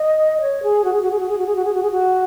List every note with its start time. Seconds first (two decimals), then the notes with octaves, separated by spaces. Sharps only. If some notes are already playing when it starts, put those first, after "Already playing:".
Already playing: D#5
0.41 C#5
0.63 G#4
0.84 F#4
0.93 G#4
1.02 F#4
1.11 G#4
1.20 F#4
1.29 G#4
1.38 F#4
1.46 G#4
1.56 F#4
1.65 G#4
1.74 F#4
1.83 G#4
1.91 F#4